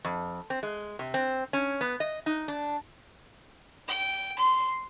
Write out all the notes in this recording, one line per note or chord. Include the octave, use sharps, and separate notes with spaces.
F2
C4
G#3
C3
C4
C#4
B3
D#5
D#4
D4
G5
C6